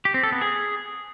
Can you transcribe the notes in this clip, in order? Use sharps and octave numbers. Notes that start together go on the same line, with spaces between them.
G4
C4
A4
B3
G#4